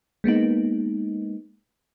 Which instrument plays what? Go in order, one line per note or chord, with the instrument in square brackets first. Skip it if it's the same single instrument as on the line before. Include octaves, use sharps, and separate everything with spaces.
[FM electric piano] G#3 A#3 B3 D#4